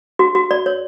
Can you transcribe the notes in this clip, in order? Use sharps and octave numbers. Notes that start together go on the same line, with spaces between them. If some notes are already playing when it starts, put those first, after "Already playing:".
F#4
F#4
D5
C#5